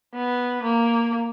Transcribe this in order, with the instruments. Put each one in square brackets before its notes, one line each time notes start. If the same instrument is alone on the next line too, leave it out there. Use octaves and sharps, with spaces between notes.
[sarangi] B3
A#3